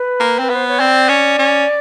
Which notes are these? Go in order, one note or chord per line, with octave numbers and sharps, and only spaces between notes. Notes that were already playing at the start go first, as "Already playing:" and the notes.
Already playing: B4
A#3
C4 B4
B3
C5
C#5
C4 D5
C#4
C#4